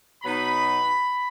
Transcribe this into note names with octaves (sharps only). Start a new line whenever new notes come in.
B2 F#3 B3 D#4 B5